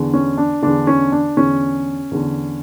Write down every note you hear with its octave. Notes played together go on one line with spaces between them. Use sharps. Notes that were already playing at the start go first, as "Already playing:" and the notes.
Already playing: E2 D3
C#4
D4
E2 D3 D4
C#4
D4
E2 D3 C#4
E2 D3